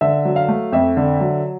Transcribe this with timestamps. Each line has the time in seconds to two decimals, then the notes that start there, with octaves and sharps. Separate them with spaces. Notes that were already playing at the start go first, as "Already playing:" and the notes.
0.01 D3 E5
0.25 F#3
0.36 F5
0.48 A3
0.72 F2 E5
0.97 D3
1.20 F#3